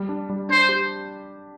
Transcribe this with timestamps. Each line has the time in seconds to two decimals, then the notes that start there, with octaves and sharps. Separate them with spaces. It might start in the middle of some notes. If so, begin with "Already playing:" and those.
Already playing: G3
0.09 D4
0.30 G3
0.49 D4 C5
0.69 G4